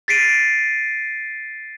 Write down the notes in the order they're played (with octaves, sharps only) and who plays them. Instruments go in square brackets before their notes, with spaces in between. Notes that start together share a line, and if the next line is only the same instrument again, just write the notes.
[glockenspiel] A6 B6 C7 D7 D#7